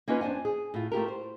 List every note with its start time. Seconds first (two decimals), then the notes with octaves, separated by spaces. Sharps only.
0.08 A#3 C#4 D#4 F4 B4
0.21 F2 D4 C5 F#5 G#5
0.45 G#4
0.74 A2 F4
0.92 A3 F4 G4 A#4
1.08 C5